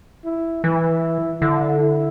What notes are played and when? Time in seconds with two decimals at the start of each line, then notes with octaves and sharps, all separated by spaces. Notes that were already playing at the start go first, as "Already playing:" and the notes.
0.25 E4
0.64 E3 E4
1.41 D3 E4
1.80 E4